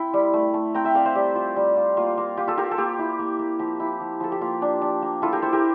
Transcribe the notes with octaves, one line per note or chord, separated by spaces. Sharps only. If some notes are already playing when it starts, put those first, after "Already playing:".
Already playing: C4 E4 G5 C6
G3
A3
A3
C4 G5 A#5
E5 G5
C4 D5 F5
C5 E5
G3 G4
F4
G3
F4
A#3 F4
A#3
F4 G4
F4 A4
F4 G4 A#4
A4
A#3 G4
E4
A#3
A#3
F3 G4
E4
F3
F3 A4
G4
A#3 F4
D4
D4
A#3
E4 F4 A4
G4 A#4
E4 A4 C5
G4 A#4